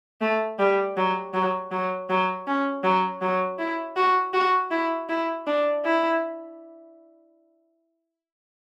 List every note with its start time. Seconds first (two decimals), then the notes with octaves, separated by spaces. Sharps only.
0.21 A3
0.59 G3
0.97 F#3
1.34 F#3
1.71 F#3
2.09 F#3
2.47 C#4
2.84 F#3
3.22 F#3
3.59 E4
3.96 F#4
4.34 F#4
4.71 E4
5.09 E4
5.46 D4
5.85 E4